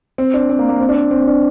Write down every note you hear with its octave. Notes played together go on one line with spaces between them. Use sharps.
C4
D4
C4
A#3
A#3
C4
D4
C4
C4
C4
D4